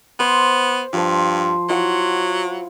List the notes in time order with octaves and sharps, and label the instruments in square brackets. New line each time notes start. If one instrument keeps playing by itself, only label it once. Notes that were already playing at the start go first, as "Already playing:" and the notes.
[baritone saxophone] B3 [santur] C5
[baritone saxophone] G2 [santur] F3 C5
[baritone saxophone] F#3 [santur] E4 F4 F#5